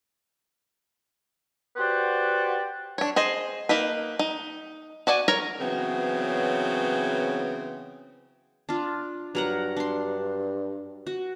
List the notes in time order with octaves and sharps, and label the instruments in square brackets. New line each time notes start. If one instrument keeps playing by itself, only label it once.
[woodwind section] F#4 G4 B4 C5 D5 F#5
[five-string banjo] D4 C#5
G#4 C5 D#5
A#3 D#4 B4
D#4
F#4 D5 F#5 G#5
A#4 C#5 A#5
[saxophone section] C#3 E3 F#3 B3 C4
[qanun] D4 F4
[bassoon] G2 [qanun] F#3 A#4 F#5
[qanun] D4 C6
F#4